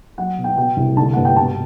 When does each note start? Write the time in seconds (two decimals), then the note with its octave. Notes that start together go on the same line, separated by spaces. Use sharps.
0.18 F#3 F#5
0.38 B2
0.44 G5
0.57 B2 G5
0.77 C2
0.97 D3 A5
1.13 G2 F#5
1.25 G5
1.36 B2 A5